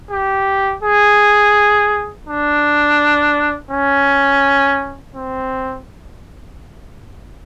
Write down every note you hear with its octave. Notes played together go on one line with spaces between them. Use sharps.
G4
G#4
D4
C#4
C4